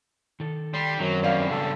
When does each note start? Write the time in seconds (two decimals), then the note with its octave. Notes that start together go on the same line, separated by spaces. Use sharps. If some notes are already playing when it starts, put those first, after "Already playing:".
0.40 D#3 A4
0.74 G3 C6
0.99 F#2 D#3 F#3 C4 C#4
1.23 E2 G2 D5 F5
1.51 C#3 A4